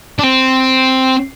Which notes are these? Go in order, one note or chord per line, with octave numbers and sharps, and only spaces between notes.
D4
C4